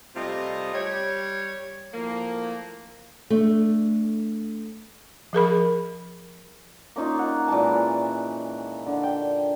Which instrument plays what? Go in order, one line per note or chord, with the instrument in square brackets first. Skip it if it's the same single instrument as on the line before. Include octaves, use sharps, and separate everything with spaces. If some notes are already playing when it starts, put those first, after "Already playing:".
[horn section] C3 G3 A3 F4 D#5
G3 C#5
A2 F3 A#3
[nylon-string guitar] A3 D4
[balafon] F3 G#4 A#4 B5
[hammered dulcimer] A#3 C#4 D#4 F4
F#5
A#2 E3 G#3 A5
D3
G5